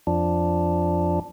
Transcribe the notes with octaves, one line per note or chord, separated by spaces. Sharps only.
F2 F3 D4